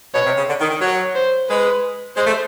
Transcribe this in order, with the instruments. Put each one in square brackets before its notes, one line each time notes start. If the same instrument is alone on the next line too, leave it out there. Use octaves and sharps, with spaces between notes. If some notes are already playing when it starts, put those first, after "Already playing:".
[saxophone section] B2 [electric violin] C#5
[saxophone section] C3
C#3
D3
D#3
D#3
[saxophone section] F#3 [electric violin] C#5
[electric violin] C5
[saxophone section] G#3 [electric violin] B4
[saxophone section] G#3 [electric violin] C5
[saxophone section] A3